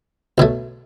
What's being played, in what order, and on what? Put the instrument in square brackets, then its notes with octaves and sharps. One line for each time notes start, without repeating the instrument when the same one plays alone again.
[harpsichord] B1 B2 F#3 A3